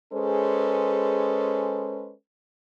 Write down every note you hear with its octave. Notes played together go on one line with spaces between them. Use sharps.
G#3 C#4 G#4 A4 B4 C5